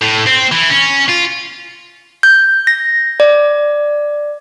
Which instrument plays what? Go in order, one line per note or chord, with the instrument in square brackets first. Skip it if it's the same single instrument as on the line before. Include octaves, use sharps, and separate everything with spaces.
[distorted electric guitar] A2
C4
E3
C#4
F4
[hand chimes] G6
A#6
D5